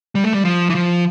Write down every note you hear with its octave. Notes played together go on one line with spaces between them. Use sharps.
G3
A3
G3
F3
E3
F3